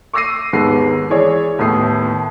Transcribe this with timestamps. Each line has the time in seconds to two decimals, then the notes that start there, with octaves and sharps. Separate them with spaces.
0.13 C#6 D6 E6 A#6 C7 D#7
0.53 D#2 G#2 B3 B4 C7
1.10 E3 G#4 C#5 D5
1.59 D#2 A2 B3 D#6 C7